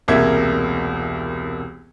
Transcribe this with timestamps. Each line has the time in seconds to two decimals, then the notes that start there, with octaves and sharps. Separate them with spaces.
0.08 E1 C2 A#3 E5 G#6